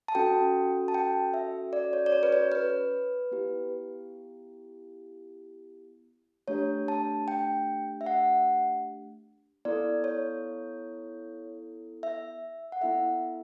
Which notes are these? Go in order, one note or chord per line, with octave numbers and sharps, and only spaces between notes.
A5
C#4 F#4 A4 G5
A5
G5
E5
D5
C#5
D5
C#5
B4
C#5
B4
B3 E4 G4
A3 D4 G4 C#5
A5
G5
E5
F#5
B3 E4 A4 D5
C#5
E5
F#5
B3 E4 A4 E5